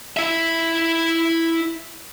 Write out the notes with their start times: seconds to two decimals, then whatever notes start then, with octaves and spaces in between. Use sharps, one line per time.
0.17 E4 E5